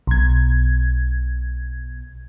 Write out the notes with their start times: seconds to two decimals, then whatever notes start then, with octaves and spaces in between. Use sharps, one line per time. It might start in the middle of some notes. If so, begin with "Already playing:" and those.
0.07 B1 G#6